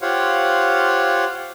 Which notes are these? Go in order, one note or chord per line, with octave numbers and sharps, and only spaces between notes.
F4 G4 C5 C#5 F5 F#5